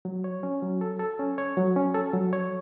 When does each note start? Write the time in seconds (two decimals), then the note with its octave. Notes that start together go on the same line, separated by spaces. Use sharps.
0.05 F#3
0.24 C#5
0.43 C#4
0.62 F#3
0.81 A4
0.99 A4
1.19 C#4
1.38 C#5
1.57 F#3
1.76 C#4
1.94 A4
2.13 F#3
2.33 C#5